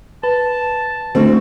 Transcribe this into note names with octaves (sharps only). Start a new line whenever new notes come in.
B4 A5
D3 A3 C4 D4 F#4